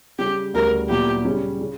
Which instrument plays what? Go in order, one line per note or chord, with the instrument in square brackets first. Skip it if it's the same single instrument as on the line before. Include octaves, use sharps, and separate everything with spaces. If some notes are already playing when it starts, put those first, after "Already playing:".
[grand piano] C#3 G3 C#4 [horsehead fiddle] G4
[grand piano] D2 C#3 G3 C#4 E4 [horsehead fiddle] A#4
[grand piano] A#2 F#3 B3 E4 [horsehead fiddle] G4
[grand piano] C#3 G3 C#4
C#3